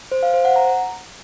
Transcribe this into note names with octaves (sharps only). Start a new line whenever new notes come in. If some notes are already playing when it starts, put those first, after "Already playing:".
C5
F5
C5
F#5
A#5